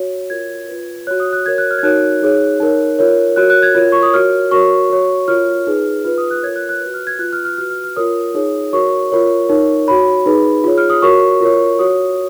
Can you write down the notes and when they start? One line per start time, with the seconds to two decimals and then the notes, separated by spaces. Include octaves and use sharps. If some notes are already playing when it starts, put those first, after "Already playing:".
Already playing: F#4 C#5
0.30 F4 A#4 C#5 G#6
0.68 F4 B4
1.07 F#4 C#5 F#6
1.20 D#6
1.33 F#6
1.45 F#4 A#4 C#5 G#6
1.58 F#6
1.71 F6
1.78 G#6
1.83 D#4 F#4 A#4 C#5 F#6
2.22 D#4 G#4 C#5
2.60 D#4 A#4 C#5
2.99 F4 A#4 C#5
3.36 F#4 A#4 C#5 F#6
3.50 F#6
3.62 G#6
3.75 F4 A#4 C#5
3.92 C#6
4.03 D#6
4.13 F#4 A#4 C#5 F6
4.51 F#4 A#4 C#5 C#6
4.90 F#4 C#5
5.28 F4 A#4 C#5 F6
5.67 D#4 G#4 B4
6.05 F4 B4 F6
6.18 D#6
6.31 F#6
6.43 F4 A#4 C#5 G#6
6.56 F#6
6.69 F#6
6.81 F#4 B4 F#6
6.94 F6
7.07 G#6
7.19 F4 B4 F#6
7.33 F6
7.45 F6
7.58 F#4 B4 F6
7.70 F6
7.84 F6
7.96 F4 A#4 C#5 D#6
8.34 D#4 G#4 C#5
8.73 F#4 A#4 C#5 C#6
9.12 F4 A#4 C#5
9.49 D#4 A#4 C#5
9.88 F#4 C#5 B5
10.26 D#4 G#4 B4
10.64 F4 G#4 C#5
10.78 F6
10.90 D#6
11.02 F#4 A#4 C#5 C#6
11.41 F4 A#4 C#5
11.79 F#4 C#5 D#6